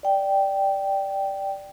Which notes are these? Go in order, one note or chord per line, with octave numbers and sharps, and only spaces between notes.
D5 G5